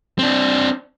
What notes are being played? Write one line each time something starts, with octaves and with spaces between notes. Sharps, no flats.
C4 D4